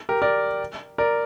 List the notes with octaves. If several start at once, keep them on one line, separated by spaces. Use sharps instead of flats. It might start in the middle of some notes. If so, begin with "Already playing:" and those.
G4 A#4
A#4 D5
A#4 D5